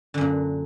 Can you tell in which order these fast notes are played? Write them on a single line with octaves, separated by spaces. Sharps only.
D3 F#2 A#2